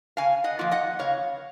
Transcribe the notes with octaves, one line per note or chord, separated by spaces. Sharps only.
C#3 F5 G#5
D#5 F#5
F3 A#3 F4
D#5 F#5
C#3 C#5 F5